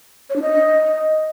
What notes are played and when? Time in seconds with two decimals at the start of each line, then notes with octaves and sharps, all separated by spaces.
0.30 C#5
0.36 D4
0.42 D#5